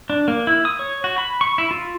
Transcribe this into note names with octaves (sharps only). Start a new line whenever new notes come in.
D4
A#3
E4
D#6
C#5
F#4
B5
C#6
E4
F4